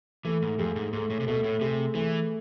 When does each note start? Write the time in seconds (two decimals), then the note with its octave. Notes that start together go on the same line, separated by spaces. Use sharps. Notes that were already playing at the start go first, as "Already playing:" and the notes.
0.25 E3 A3
0.42 G#2
0.59 F2 G#4
0.76 G#2
0.93 G#2 A3
1.10 A2
1.20 C3
1.27 B2 A3
1.44 A2
1.61 C3 G#4
1.94 E3 A3